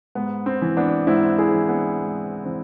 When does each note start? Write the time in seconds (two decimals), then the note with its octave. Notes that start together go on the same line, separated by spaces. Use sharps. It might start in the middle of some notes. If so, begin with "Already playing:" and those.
0.15 G#2 B3
0.46 C4
0.62 E3
0.77 B3 D4
1.07 G#2 C4 E4
1.38 E4 G#4
1.53 E3
1.68 B3 D4
1.99 G#2
2.45 E3 C4